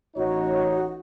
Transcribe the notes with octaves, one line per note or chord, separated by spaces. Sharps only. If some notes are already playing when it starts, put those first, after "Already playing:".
A1 D#4 F#4 C#5